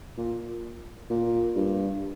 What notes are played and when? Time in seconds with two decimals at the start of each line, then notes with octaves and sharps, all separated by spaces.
0.18 A#2
1.10 A#2
1.56 G2